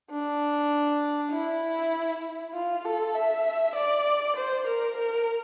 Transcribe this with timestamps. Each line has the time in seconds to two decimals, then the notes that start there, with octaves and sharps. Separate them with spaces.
0.11 D4
1.32 E4
2.54 F4
2.85 A4
3.15 E5
3.75 D5
4.36 C5
4.67 A#4
4.97 A#4